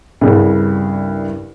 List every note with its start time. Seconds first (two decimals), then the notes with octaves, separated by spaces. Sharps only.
0.21 C2 G2 C#3